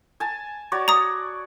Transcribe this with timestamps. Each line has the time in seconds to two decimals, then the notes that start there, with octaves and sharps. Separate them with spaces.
0.20 G#5 A5
0.72 F#4 C#5 D5
0.88 A#5 D#6